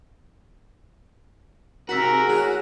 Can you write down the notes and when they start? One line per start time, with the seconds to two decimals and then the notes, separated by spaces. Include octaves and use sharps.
1.89 G#2 C3 F#4 A#4 E6 B6 F#7
2.27 A2 G#4